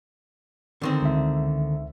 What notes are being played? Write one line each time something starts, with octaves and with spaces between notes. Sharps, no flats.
D3 D#3 C4
C#2 E5